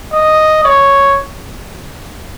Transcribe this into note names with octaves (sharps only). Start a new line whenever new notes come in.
D#5
C#5